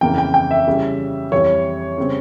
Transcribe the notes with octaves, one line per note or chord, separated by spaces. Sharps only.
F2 C#3 E3 A#3 G5
G5
G5
E5
C#3 E3 G3
F2 E3 G3 C#5
C#3 G3 C4